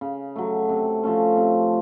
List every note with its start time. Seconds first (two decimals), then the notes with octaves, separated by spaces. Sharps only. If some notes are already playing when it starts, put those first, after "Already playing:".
0.01 C#3
0.36 F#3 A3
0.69 C3
1.03 F3 A3 C#4
1.37 C3